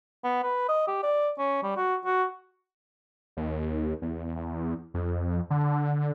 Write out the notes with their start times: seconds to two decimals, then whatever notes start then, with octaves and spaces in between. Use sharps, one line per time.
0.23 B3
0.43 B4
0.68 D#5
0.87 G4
1.03 D5
1.38 C#4
1.63 G3
1.76 F#4
2.05 F#4
3.37 D#2
4.02 E2
4.94 F2
5.50 D3